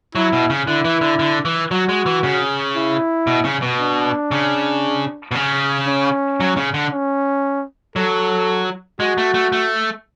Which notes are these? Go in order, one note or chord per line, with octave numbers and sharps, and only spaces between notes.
F#3 E4
B2
C#3
D3 E4
E3
D3
D3
E3
F#3 F#4
G#3
E3
C#3
E4
B2
C#3
B2
D4
C#3
B2
C#3
C#4
F#3
C#3
D3
C#4
F#3 A4
G#3 F#4
A3
A3
A3